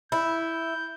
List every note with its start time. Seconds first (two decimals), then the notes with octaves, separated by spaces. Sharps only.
0.12 E4 G6